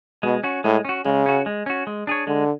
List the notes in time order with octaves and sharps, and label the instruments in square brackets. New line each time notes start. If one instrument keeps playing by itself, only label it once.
[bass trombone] B2 [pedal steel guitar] G#3
[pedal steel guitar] C#4 F#4
[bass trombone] A2 [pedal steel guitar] G#3
[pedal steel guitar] C#4 F#4
[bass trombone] C#3 [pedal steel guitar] G#3
[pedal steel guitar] C#4 F#4
G#3
C#4 F#4
G#3
D4 G#4 C#5
[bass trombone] D3 [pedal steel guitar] G#3